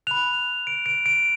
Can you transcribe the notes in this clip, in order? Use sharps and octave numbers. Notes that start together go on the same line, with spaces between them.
B5 F#6 F7
D7
D7
D7